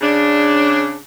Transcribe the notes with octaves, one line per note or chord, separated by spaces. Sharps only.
C#3 D4